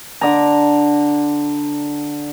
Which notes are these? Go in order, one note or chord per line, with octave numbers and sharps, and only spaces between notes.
D3 A#5